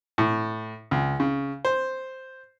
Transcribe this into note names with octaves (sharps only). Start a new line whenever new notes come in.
A2
C#2
C#3
C5